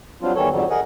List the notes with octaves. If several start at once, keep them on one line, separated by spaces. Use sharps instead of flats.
F#3 G3 C4 D4 F4
E2 D#3 E3 G3 A4 C#5
F2 G#2 D3 F#3 G3
G#4 A#4 D#5 F#5 G#5